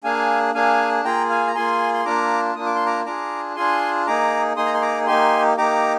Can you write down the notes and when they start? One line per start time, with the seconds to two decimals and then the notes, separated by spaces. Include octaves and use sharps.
0.04 A#3 D4 G#4 F5 G#5
0.54 A#3 D4 G#4 F5 G#5
1.04 A#3 F4 G#4 G5 A#5
1.30 F5 G#5
1.47 A#5
1.55 A#3 F4 G#4 G#5 C6
1.94 C6
2.05 A#3 D4 F4 A#5 D6
2.55 A#3 D4 F4 D#6
2.66 D6
2.75 C6
2.86 A#5 D6
3.05 D4 F4 G#4 A#5 D6
3.56 D4 F4 G#4 G#5 C6
4.06 A#3 D#4 G#4 A#5 D6
4.56 A#3 D#4 G#4 C6 D#6
4.66 A#5
4.74 C6
4.82 A#5 D6
5.07 A#3 D#4 G4 G#5 C6
5.58 A#3 D#4 G4 A#5 D6